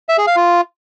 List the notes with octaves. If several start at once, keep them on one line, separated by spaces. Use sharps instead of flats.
E5
G#4
F5
F4